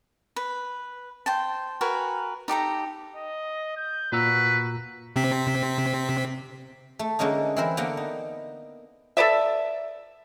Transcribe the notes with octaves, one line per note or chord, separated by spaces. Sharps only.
B4
C5 G5 A5
F#4 A#4 B4 G#5
D#4 G4 A4 A#5
D#5
G6
A#2 F#4 B4 A#5 E6
C3 C4 B6
A3
D3 G#3 A#3 C#4 D#4
E3 C4 E4 A#4 C5 E5
D3 A#3 B3 G5
D#4
A4 B4 D5 E5